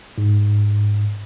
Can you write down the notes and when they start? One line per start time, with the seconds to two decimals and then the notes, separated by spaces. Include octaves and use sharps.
0.18 G#2